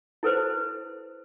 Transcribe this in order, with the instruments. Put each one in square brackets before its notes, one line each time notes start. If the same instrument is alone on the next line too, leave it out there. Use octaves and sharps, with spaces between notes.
[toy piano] E4 A4 B4 C5